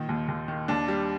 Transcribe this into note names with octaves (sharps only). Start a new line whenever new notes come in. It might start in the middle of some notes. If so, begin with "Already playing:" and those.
Already playing: A#2 D#3
D#2
D#2
D#3
D#2 D4
G3